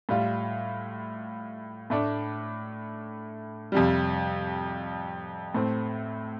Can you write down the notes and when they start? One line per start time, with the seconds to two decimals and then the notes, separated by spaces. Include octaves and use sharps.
0.09 A2 G3 F4
1.90 A2 A3 D4
3.72 F2 C3 G3
5.54 A2 A3 C4